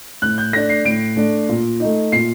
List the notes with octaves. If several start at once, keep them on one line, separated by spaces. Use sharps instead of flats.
A2 F#6
G6
A3 D4 A#6
C7
A2 D7
A3 D4
A#2
A3 D#4
A#2 C7